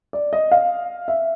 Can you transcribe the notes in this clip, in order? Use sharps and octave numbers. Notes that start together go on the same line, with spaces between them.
D5
D#5
F5
E5